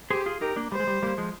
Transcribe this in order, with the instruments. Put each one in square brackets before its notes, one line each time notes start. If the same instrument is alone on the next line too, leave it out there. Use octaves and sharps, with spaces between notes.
[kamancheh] G4 [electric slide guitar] G#4 C5
[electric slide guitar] F4 G#4
[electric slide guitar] D#4 G4 [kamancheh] A#4
[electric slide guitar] A#3 D4
[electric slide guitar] G3 [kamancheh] C5
[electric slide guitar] G#3
G3
G3 A#3
F3 G#3